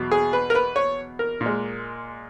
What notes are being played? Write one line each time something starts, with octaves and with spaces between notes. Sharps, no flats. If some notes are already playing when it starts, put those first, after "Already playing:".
Already playing: E2 B2 F#3
G#4
B4
A#4
B4
C#5
A#4
A#2
G#3